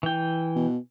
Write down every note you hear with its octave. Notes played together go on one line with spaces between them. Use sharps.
E3 G5
B2